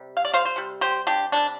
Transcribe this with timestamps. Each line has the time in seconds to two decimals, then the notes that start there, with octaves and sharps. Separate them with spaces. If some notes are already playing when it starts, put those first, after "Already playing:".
Already playing: C3 G3
0.17 F5
0.25 D5
0.34 C5 F5
0.45 C5
0.56 C3 G3
0.81 G4 C5
1.07 D4 G4
1.32 C3 G3 D4